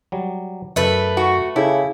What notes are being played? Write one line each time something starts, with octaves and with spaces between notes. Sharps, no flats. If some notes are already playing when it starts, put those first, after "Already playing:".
F#3 G3
F#2 A3 A4 B4 E5
F#4
C#3 E4 G4 A4